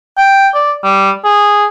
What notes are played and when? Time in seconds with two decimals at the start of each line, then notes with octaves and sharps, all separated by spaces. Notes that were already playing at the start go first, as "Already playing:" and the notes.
0.18 G5
0.54 D5
0.84 G3
1.24 G#4